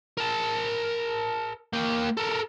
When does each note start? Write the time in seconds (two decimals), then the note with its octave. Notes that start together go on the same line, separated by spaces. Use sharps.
0.17 A#4 A5
1.73 A#3 G5
2.17 A4 A#4